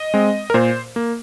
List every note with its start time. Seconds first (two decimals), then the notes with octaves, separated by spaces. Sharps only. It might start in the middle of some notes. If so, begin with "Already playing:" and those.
Already playing: D#5
0.14 G#3 C4
0.50 A#4
0.54 A#2 C5
0.96 A#3